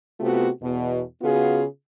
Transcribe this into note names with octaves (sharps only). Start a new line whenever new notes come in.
C3 A3 B3 F4 F#4
E2 B2
C#3 B3 F4 F#4 G#4